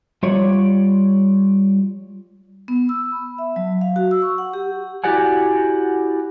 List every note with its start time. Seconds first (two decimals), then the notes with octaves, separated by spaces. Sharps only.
0.23 G3 F4 C#5 D5
2.68 B3
2.89 E6
3.12 B5
3.38 E5
3.56 F#3
3.81 F5
3.96 F#4
4.11 E6
4.22 C#6
4.38 F#5
4.54 G4
5.04 E4 F#4 G4 D5 F#5 G#5